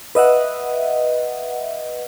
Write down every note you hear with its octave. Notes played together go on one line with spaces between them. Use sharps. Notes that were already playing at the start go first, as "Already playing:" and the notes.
B4 D#5 E5 F#5